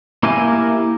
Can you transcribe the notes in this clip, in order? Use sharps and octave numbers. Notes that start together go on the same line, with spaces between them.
A#3 E4 G4 A#4 G#5